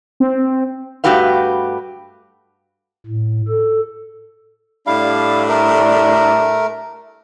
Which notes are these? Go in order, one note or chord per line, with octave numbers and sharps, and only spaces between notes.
C4
G2 A3 F#4 G4 B4 F5
A2
A4
A2 G3 D4 E4 F5
A3 A#4